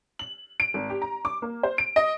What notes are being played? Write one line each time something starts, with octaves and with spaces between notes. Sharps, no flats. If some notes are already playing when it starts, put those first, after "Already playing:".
F#7
D7
G#1
G4
A#5
D6
A#3
C5
D7
D#5